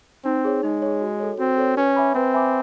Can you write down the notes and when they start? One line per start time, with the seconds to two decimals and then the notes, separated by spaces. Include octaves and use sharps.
0.25 C4 D#4
0.44 G#4 C#5
0.63 G#3 D#4
0.82 G#4 C#5
1.01 F#4
1.20 A4 C#5
1.39 C4 F#4
1.58 A4 C#5
1.77 C#4 B4
1.96 E5 G#5 B5 D6
2.15 C4 B4
2.34 E5 G#5 B5 D6